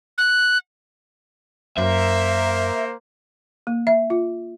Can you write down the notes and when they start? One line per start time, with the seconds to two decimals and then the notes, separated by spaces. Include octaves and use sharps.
0.18 F#6
1.78 F#2 A#3 A#4 C5 E5
3.67 A#3
3.87 E5
4.10 F4